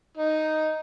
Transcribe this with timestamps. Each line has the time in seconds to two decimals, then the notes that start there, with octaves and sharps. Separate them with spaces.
0.17 D#4